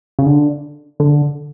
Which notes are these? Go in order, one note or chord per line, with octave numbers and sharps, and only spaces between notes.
C#3
D3
D3